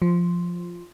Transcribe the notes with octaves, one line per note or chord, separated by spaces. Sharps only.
F3